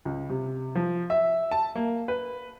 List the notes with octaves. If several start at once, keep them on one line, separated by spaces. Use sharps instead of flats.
C#2
C3
F3
E5
A5
A#3
B4